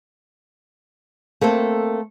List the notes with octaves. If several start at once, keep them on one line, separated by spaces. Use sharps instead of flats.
A3 A#3 C4 A4